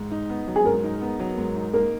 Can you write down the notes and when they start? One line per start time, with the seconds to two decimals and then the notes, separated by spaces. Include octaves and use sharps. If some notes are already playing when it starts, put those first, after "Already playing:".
Already playing: G#2
0.11 D#4
0.29 B3
0.47 F#3
0.56 G#4
0.65 G#2 A#4
0.84 D#4
1.01 B3
1.19 F#3
1.38 G#2
1.56 D#4
1.73 A#3 A#4